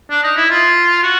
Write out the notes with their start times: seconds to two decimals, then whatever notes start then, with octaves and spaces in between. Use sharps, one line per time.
0.10 D4
0.23 D#4
0.37 E4
0.50 F4
1.03 F#4